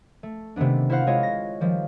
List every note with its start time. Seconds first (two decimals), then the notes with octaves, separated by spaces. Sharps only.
0.23 A3
0.56 C3 D#3 A3 B3 D4
0.90 E4 F#4 C5 F5 F#5
1.07 G#3 E4 F4 C#5 D#5
1.23 A#6
1.61 D#3 F3 G3